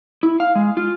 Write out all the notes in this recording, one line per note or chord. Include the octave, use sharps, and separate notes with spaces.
E4
F5
G#3
F4